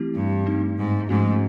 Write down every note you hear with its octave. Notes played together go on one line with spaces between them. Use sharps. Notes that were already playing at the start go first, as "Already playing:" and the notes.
Already playing: E3 A3 C4 E4 G4
G2
A3 C4 D#4
G#2
G#2 F3 A3 C#4 F#4